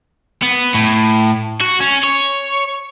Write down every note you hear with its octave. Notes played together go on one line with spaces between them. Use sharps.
B3
A2
F#4
C#4
C#5